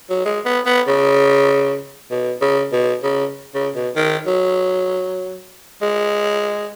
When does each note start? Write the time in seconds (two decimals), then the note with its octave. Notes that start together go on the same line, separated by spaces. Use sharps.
0.10 F#3
0.25 G#3
0.45 B3
0.66 B3
0.87 C#3
2.10 B2
2.41 C#3
2.72 B2
3.03 C#3
3.54 C#3
3.75 B2
3.96 D#3
4.27 F#3
5.82 G#3